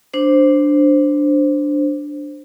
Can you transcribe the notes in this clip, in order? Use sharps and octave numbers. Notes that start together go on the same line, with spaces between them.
D4 C5